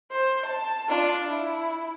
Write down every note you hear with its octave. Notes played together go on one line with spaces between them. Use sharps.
C5
A5
D4 F4
E4